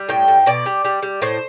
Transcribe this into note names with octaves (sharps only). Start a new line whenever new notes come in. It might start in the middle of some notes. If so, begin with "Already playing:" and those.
Already playing: G3
A2 G5
A2
B2 D5
G3
G3
G3
A2 C5